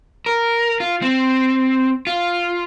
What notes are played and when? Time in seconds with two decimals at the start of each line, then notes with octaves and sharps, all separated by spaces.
0.26 A#4
0.80 F4
1.02 C4
2.07 F4